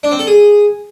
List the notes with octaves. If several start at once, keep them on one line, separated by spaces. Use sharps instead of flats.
D4
C4
A4
G#4